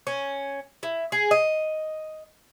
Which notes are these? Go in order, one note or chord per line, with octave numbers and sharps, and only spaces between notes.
C#4
E4
G#4
D#5